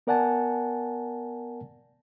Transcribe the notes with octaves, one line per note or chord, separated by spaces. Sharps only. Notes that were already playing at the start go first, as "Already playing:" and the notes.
B3 A#4 D5 F#5 G#5 A5